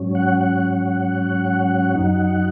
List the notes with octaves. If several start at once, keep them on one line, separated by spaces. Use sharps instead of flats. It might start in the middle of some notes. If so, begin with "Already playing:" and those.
Already playing: G#2 F#3 C#4
F#5
F#5
F#2 F#3 D#4